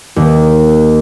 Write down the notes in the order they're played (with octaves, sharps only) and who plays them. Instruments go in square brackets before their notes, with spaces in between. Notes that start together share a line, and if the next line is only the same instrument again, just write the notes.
[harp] D#2 D#3 A#3